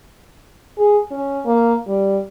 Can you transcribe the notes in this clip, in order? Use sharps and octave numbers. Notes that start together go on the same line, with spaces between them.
G#4
C#4
A#3
G3